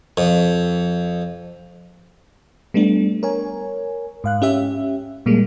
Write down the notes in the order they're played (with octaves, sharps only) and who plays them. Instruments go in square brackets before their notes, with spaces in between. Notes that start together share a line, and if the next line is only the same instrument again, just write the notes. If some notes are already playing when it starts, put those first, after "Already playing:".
[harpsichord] F2
[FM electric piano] G3 A3 B3 D4
A#4 C#5 G#5
G#2 F5 F#6
C#4 G4 E5
A#2 G3 G#3 A#3